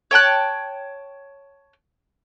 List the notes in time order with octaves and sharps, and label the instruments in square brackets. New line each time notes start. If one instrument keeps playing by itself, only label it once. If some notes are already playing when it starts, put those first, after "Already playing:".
[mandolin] C#5 G5 A5 F#6